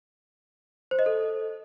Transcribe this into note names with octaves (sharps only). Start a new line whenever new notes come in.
C5
D#5
A4